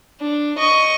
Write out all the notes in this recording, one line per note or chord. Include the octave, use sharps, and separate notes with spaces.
D4
D#5 C#6